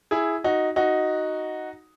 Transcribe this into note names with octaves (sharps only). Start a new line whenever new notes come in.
E4 G#4
D#4 F#4
D#4 F#4